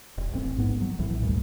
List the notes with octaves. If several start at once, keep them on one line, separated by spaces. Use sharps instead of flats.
E1
A1 C4
G#2 B3
F#3
A#1 A2 E3
G1 D2 G2 A#2